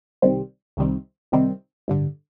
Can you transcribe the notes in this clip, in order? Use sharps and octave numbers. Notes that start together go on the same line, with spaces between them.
C2 C3 D#3 G3 C4
C2 C3 D#3 G3 C4
C2 C3 D#3 G3 C4
A1 G2 D3 G3